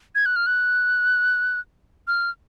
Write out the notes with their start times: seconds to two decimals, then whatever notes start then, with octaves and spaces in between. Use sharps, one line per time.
0.15 G#6
0.26 F#6
0.36 F6
0.47 F#6
2.08 F6